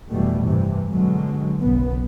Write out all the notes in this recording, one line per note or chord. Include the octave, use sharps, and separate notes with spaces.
F1 B2 E3 G3 A3
G2 C3 E3
B2 D3 F#3 G#3
F#1 B1 B3